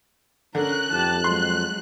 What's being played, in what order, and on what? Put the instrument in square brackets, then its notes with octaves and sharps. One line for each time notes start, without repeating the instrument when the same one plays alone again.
[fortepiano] D3 [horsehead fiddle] C#4 A#4 [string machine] F#6
[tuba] F2 [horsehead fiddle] G4 A5
[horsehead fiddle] F#3 G#3 [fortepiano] C6